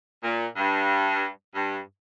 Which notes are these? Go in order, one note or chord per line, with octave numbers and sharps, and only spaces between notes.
A#2
G2
G2